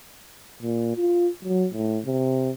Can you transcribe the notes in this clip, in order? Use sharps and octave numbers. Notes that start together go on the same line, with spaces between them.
A#2
F4
F#3
A2
C3